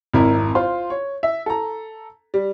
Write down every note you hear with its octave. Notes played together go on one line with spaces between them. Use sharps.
G#1 F2 E4 A#4
F4 C5 C6
C#5
E5
A4 A#5
G3